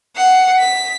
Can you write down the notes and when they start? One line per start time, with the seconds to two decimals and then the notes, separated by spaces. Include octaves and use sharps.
0.17 F#5 C7
0.59 B6